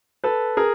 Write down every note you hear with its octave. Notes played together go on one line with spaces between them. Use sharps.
A4 B4
G#4 A#4